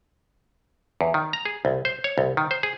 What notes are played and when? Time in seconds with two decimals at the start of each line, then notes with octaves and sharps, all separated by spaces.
1.01 E2
1.14 D#3
1.33 A#5
1.45 G#4
1.65 C2
1.85 C5
2.04 C#5
2.18 C2
2.37 D#3
2.51 C5
2.63 G#4